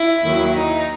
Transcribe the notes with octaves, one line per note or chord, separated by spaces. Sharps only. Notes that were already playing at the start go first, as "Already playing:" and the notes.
Already playing: E4
D#2 D#3 F#3
D#4